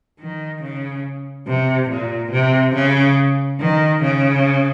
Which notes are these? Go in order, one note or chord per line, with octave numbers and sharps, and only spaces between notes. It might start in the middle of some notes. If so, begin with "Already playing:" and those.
D#3
C#3
C3
A#2
C3
C#3
D#3
C#3